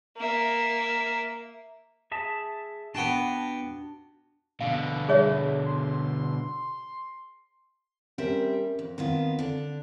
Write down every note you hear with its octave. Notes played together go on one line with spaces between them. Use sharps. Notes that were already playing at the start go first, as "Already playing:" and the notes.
A#3 E5
G#4 E5 A5
B3 D4 F#4 G5 A5
B2 D3 F5
G#4 C#5 E5
C6
G3 C4 C#4 A#4 E5
F2
D#3 B3 C4 F4
D3 D4